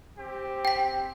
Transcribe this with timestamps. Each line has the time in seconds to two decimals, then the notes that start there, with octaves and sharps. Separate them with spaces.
0.17 C4 G4
0.65 G5 B6